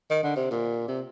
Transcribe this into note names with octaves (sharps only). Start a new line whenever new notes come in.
D#3
D3
C3
A#2
C3